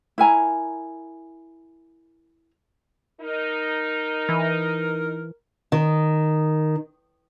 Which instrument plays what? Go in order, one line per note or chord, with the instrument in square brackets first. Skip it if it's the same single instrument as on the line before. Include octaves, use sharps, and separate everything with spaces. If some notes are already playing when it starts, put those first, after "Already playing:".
[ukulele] E4 A#4 G#5 A#5
[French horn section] D#4 [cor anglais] A#4
[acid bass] E3
[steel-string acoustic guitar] D#3